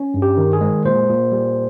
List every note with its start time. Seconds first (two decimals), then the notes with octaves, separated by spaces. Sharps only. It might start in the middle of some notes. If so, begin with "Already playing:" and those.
Already playing: C#4
0.14 G2
0.22 G4
0.37 D#3
0.53 G#4
0.61 G#3
0.85 A#2 C5
1.09 A#2
1.32 G3